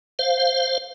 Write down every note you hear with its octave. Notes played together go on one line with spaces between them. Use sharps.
C5 F5